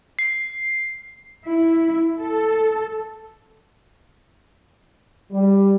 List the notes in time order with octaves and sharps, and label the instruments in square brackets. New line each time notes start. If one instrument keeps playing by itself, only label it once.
[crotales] C7
[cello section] E4
A4
[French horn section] G3